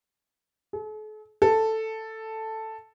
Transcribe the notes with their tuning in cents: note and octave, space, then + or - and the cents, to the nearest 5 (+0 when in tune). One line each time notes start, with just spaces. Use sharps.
A4 -45
A4 +5